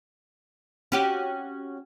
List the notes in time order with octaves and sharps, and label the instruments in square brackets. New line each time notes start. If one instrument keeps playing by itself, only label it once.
[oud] C#4 F#4 G4